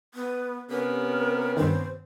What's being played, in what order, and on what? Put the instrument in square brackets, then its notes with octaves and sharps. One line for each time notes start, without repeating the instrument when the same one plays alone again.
[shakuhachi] B3
[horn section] C3 B3 C#4 [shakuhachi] A#4
[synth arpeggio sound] G2 D#3 [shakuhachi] C5